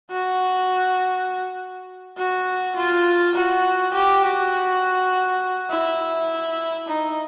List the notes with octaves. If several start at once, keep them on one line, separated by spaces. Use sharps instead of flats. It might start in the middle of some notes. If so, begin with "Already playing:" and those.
F#4
F#4
F4
F#4
G4
F#4
E4
D#4